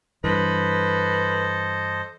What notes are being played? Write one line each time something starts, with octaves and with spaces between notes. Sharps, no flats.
G2 E3 A4 B4 C5 D#5